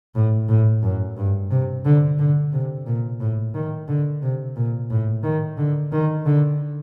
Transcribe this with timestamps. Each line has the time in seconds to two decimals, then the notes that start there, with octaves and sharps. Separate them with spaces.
0.15 A2
0.49 A2
0.82 F#2
1.17 G2
1.51 C3
1.85 D3
2.19 D3
2.53 C3
2.87 A#2
3.20 A2
3.54 D#3
3.88 D3
4.22 C3
4.56 A#2
4.90 A2
5.23 D#3
5.58 D3
5.92 D#3
6.26 D3